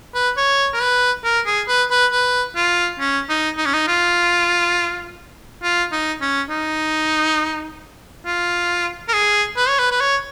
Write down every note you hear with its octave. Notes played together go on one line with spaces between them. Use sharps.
B4
C#5
A#4
B4
A#4
G#4
B4
B4
B4
F4
C#4
D#4
D#4
C#4
D#4
F4
F4
D#4
C#4
D#4
F4
A#4
G#4
B4
C#5
B4
B4
C#5